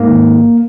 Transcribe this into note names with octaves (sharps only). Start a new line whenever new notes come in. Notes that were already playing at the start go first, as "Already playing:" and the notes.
Already playing: G#2 A#3
G#1